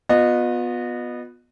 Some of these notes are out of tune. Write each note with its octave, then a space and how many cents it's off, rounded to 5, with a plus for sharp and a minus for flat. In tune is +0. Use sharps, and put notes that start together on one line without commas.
B3 +0 F4 +40 D#5 -25